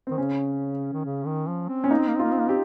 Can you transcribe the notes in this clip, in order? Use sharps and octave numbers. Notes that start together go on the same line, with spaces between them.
D#3 C4
C#3 C#4
D#3
C#3
D#3
F3
C4
C#4
A#3 D#4
C4
A#3
C4
F4
A#3
C4
A#3
C4 G4